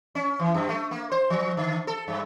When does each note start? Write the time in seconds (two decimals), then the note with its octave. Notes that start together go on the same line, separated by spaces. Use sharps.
0.15 C#4
0.39 E3
0.54 F#2
0.69 A3
0.91 A#3
1.11 C5
1.30 F3
1.57 D3
1.87 A4
2.08 G2